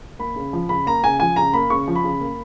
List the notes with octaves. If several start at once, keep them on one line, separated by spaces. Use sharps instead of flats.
A#3 B5
C#3
F3
C#3 B5
A#3 A#5
C#3 G#5
F3 G#5
C#3 A#5
A#3 B5
C#3 C#6
F3
B5
C#3
A#3